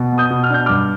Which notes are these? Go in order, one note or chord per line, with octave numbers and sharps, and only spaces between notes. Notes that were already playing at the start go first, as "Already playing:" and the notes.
Already playing: B2
B3
D#6 G6
B2
F6
D4 G6
G2 D6 F6